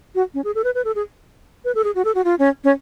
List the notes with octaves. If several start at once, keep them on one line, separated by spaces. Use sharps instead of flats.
F#4
C#4
G#4
A4
B4
B4
A4
G#4
B4
A4
G#4
F#4
A4
F#4
F4
C#4
C#4